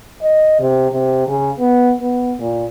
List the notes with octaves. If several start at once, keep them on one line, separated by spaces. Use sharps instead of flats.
D#5
C3
C3
C#3
B3
B3
A#2